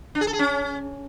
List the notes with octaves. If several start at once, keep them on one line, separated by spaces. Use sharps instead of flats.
D4
G#4
A4
G#4
C#4